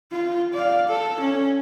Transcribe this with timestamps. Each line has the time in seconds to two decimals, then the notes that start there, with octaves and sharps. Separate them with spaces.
0.11 F4
0.53 D5 F5
0.88 A4
1.20 C#4